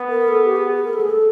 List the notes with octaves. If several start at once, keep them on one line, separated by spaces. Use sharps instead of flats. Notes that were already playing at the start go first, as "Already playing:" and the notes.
Already playing: B3
A#4
A4
G4
G#4
A#4
A4
G#4
A4